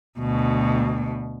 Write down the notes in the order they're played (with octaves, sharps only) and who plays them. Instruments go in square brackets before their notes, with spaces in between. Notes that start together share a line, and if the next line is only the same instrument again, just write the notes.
[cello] D2 B2